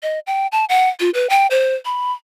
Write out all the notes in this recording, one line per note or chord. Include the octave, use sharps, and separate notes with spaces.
D#5
G5
A5
F#5
F4
B4
G5
C5
B5